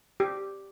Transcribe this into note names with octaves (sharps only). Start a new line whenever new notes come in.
G4